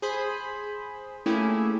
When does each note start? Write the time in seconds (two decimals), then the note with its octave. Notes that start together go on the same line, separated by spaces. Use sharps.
0.02 G#4 C5 B5
1.26 A3 A#3 C#4 E4 G4 G#4